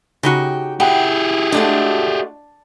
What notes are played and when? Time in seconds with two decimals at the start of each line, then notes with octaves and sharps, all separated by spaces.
0.23 C#3 D#4 F#4 G4
0.80 E4 G4 G#4 F#5 G5
1.52 G#3 A3 D4 F#4